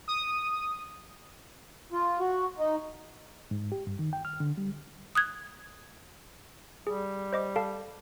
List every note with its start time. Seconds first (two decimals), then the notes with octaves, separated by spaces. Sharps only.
0.08 D#6
1.92 F4
2.20 F#4
2.58 D#4
3.51 G#2
3.72 G4
3.87 G2
3.99 D#3
4.13 G5
4.25 F6
4.40 D3
4.58 G3
5.15 D#6 F#6 G#6
6.87 G3 G#4
7.33 C5 D#5 D6
7.56 A4 F5 A5